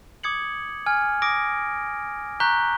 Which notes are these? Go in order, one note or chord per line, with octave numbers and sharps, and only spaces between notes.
D6 D#6 G#6 C#7 F#7
G#5 F6 G#6
D6 D#6 A#6 D7
A#5 C#6 F#6 G6 B6 G7